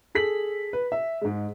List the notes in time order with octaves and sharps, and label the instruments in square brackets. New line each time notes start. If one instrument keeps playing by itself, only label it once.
[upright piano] G#4 A4 B6 F#7
B4
E5
G#2 G#3